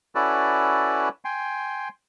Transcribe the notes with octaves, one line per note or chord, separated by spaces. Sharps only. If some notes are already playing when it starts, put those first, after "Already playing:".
C#4 E4 F#4 A4 B4 D5
G5 G#5 C6